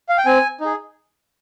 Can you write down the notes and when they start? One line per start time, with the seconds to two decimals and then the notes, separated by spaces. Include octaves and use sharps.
0.09 F5
0.18 G5
0.26 C4 G#5
0.61 D#4 G#4